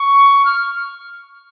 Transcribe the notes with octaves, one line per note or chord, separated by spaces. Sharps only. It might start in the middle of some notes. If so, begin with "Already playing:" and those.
Already playing: C#6
F6